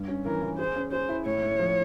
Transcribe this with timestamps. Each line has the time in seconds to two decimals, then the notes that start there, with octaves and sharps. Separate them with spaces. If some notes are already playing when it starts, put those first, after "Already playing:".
Already playing: G2
0.08 C#4
0.25 E3 A#4
0.42 E3
0.58 G#4 C5
0.76 C#4
0.92 G#4 C5
1.09 E4
1.26 A2 C#5
1.42 A2
1.59 F3